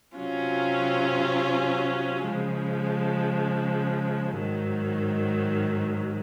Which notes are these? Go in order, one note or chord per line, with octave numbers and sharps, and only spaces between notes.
C3 F#3 C#4 F4
C#3 F3 G#3
G#2 D#3 F#3